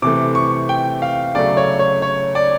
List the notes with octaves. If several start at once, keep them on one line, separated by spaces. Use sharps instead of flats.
C3 E3 A3 D6
C#6
G5
F5
C#3 F#3 A3 D5
C#5
C#5
C#5
D5